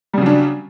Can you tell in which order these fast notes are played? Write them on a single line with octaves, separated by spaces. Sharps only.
G3 C#3 F#3 D4